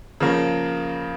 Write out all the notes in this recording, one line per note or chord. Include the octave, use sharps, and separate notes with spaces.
C#3 F3 A#3